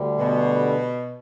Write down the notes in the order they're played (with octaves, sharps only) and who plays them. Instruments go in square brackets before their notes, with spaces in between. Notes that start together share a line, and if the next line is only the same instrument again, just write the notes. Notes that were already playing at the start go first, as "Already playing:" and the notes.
Already playing: [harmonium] D2 D3 G3
[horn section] B2